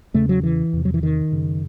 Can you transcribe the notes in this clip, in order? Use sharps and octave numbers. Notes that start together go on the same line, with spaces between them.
E2 C#3 A3
F#3
E3
E2 C3
F#3
E3
D#3
F#2 C#3